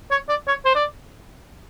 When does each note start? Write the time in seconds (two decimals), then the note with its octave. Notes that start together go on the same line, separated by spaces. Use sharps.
0.11 C#5
0.29 D5
0.48 C#5
0.65 C5
0.75 D5